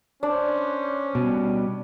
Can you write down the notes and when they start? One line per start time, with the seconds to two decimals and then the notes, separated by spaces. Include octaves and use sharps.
0.23 C#4 D4 C5
1.15 B2 G3